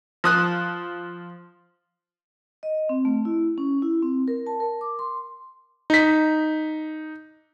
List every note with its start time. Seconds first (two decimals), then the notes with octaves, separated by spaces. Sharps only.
0.24 F3 D#6 F#6
2.63 D#5
2.89 C4
3.05 A3
3.25 E4
3.58 C#4
3.82 E4
4.03 C4
4.28 A#4
4.47 A5
4.60 A#4
4.81 D6
4.99 C6
5.90 D#4 B6